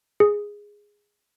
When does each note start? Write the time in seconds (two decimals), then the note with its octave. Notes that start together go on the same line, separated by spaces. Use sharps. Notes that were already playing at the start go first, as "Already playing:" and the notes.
0.20 G#4